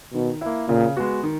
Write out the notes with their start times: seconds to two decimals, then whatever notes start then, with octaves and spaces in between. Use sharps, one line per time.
0.14 B2 D#3
0.41 A#3 E4
0.69 A#2 C#3
0.97 G#3 B3 F#4
1.23 D#3